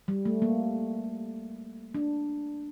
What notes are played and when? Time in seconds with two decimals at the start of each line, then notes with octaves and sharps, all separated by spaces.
0.08 G3
0.25 A3
0.42 A#3
1.95 D4